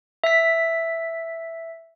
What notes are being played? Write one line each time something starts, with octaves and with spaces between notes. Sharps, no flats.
E5 B6